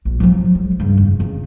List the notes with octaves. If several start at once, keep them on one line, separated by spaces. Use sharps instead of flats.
A#1
F3 F#3
G#3
G2 C#3
F2
C#3